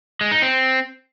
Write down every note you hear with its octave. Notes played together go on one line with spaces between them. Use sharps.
G#3
D#4
C4